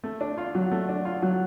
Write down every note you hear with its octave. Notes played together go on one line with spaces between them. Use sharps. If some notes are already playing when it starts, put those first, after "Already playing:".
A3
D4
F4
F#3
A3
D4
F4
F#3